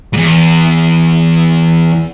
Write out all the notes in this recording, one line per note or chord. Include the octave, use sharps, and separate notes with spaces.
E2 G#2